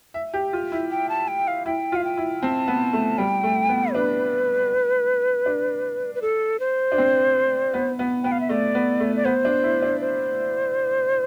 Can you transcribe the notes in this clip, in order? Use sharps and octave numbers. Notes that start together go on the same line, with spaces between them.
E5
G4
F4
E4
G5
A5
G5
F5
E4 G5
F4
F5
G5
E4
C4 A5
B3
A3
G3 G5
A3
B3
D4 B4
D4
B4
A4
C5
D4
C4
B3
B3
B3 G5
F5
E5
A3 D5
B3
A3
D5
B3 C5
D4
E4
D4
C5